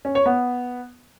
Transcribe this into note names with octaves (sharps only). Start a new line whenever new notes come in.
C#4
C#5
B3